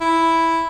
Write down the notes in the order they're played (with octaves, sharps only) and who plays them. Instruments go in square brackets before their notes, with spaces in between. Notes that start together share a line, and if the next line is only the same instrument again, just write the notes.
[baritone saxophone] E4